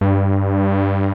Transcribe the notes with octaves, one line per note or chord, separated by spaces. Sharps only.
G2